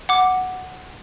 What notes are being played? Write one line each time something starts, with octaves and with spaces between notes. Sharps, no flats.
F#5 D6